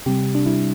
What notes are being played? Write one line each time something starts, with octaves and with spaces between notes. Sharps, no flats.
C3 G3 G4
D4
C3 G3 E4